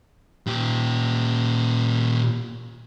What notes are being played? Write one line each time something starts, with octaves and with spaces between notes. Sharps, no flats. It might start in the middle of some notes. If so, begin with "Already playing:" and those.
A#2 G4